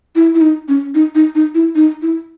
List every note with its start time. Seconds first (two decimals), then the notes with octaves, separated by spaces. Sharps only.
0.16 E4
0.35 E4
0.41 D#4
0.68 C#4
0.95 D#4
1.15 D#4
1.35 D#4
1.55 E4
1.75 D#4
2.02 E4